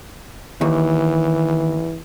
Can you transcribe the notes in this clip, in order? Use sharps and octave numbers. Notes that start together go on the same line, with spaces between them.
D#2 E3